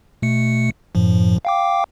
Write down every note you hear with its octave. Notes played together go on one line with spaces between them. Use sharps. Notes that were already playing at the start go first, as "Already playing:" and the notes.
B2 A3 C#7
F#2 A2 F3
F5 G5 D6